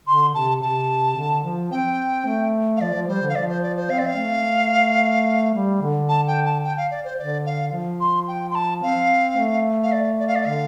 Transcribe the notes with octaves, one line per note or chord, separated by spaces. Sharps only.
D3 C6
C3 A5
C3 A5
D3
F3
C4 G5
A3
F5
F3 D5
F3
G3 C5
D3
F5
F3 D5
C5
D5
C5
C4 F5
D5
F5
A3
G3
D3
A5
G5
A5
G5
F5
D5
C5
D3 D5
F5
F3
C6
G5
C6
A5
C4 F5
A3
F5
D5
D5
F5
D5
D3 F5